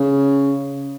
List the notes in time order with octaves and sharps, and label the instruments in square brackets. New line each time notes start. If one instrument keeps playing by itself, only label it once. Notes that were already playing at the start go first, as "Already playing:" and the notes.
Already playing: [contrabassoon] C#3